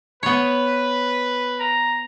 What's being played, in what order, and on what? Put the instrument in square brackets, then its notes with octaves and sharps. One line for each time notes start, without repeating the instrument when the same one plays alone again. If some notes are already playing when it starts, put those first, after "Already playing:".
[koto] B3 C#5 [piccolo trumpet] B4
[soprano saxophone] A#5